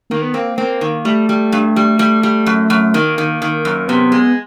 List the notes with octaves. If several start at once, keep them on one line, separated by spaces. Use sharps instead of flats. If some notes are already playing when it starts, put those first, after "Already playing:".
D#3 A#3
B3
A#3 C4
A#3 C4
D#3
G3 A3
G3
G2
G3
G3
G3
F#2
F#2
D#3 A#3
D#3
D#3
F#2
C3 B3
G#3